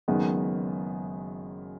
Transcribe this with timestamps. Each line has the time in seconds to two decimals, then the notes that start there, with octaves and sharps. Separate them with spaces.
0.08 F#1 F#2 D#3 G#3 B3